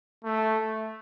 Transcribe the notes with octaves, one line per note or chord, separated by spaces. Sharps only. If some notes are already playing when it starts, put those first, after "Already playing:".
A3